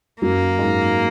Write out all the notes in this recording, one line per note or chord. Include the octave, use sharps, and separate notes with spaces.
F#2 F#3 A#3
G#2 G#3